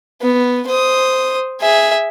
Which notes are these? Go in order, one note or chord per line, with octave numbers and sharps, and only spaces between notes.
B3
C5 D#6
G#4 E5